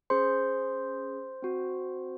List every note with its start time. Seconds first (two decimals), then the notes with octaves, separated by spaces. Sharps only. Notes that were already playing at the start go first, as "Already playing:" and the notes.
0.10 C#4 G#4 C5 C6
1.42 C4 F#4